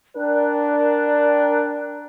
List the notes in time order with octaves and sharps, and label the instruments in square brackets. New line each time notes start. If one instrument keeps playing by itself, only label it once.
[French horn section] D4 A#4 [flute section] D5 G5 F#6